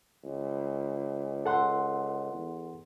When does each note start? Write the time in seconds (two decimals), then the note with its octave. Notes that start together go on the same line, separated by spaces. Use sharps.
0.24 C#2
1.46 A4 F#5 C6
2.33 E2